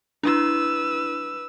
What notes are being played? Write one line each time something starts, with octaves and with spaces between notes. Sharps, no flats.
D4 E4 B4 E6